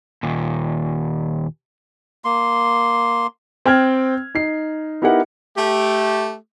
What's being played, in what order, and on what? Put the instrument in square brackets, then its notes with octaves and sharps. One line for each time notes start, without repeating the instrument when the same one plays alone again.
[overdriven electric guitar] D#2 A#2
[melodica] A#3 C6
[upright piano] C4 G5 F6 G#6
D#4 C7
B3 D#4 E4 G4 A#4 F#5
[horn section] A3 G4